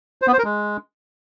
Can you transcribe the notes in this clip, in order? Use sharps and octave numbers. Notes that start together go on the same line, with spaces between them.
C5
B3
C5
A#4
G#3